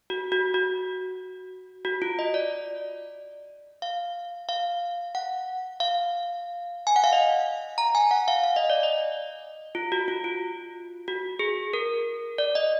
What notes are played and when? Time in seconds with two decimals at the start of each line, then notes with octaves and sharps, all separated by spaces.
0.10 F#4
0.32 F#4
0.54 F#4
1.85 F#4
2.02 F4
2.19 D#5
2.34 D5
3.82 F5
4.49 F5
5.15 F#5
5.80 F5
6.87 G#5
6.96 F#5
7.04 F5
7.13 D#5
7.78 A#5
7.95 G#5
8.11 F#5
8.28 F5
8.44 F5
8.56 D#5
8.70 D5
8.83 D#5
9.75 F4
9.92 F#4
10.08 F4
10.24 F4
11.08 F#4
11.39 G#4
11.73 A#4
12.38 D5
12.55 D#5